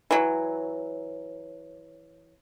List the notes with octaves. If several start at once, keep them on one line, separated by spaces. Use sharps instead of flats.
E3 F#3